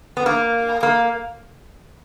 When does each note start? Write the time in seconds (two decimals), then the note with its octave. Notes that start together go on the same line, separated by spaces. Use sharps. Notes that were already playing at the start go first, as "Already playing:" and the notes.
0.17 B3
0.26 A#3
0.83 A#3